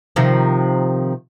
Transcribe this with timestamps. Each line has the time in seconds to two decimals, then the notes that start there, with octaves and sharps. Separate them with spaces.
0.16 C3 D#3 F3